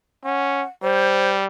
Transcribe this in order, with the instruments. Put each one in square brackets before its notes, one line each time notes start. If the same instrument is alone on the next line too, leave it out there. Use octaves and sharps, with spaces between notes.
[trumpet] C#4 [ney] F#5
[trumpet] G3 [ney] C5